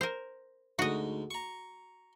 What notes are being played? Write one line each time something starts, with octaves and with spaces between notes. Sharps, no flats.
A#4 C5
D2 G#2 F#4 D#5
A#5 C#6